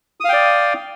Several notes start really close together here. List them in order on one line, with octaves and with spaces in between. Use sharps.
D#6 F5 G5 D5